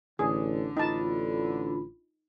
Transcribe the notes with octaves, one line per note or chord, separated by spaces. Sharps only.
A1 D3 G#4
A1 D4 D#4 F4 A5 B5